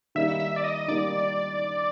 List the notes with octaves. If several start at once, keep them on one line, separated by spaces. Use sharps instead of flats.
D#3 G3 A#3 D#4 E5
E5
D5
D#5
D#3 G3 A#3 D#4 D5